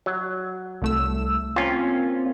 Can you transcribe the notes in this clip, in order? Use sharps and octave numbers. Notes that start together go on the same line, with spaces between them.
F#3
C2 A3 E6
A#3 C4 C#4 F4